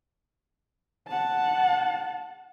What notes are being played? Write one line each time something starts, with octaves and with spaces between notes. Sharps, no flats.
F#5 A5